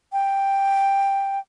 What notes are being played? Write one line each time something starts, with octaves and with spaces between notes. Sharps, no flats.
G5